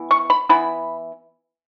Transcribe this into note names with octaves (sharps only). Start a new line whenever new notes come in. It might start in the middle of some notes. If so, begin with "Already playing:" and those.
Already playing: E3 B3 E4
C#6
B5
E3 B3 E4 B5